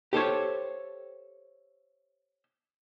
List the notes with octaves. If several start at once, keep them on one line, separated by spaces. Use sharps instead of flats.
G4 A4 C5 C#5